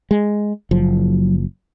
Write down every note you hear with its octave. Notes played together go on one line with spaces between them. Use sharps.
G#3
F#1 F3 F#3